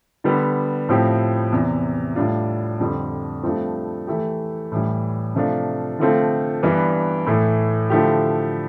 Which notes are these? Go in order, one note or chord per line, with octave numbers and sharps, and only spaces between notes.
D3 G3 B3
A2 F3 C4 E4 G4
E2 C3 E3
A2 G3 D4 F4
F2 D3 G3
G2 F3 A3 C4
E3 A3 E4 G4
A2 E3 G3
C3 F3 A3 D4 F4
D3 F3 A3 C4 F4
G2 E3 B3 D4
A2 E3 A3
D3 F3 A3 E4 G4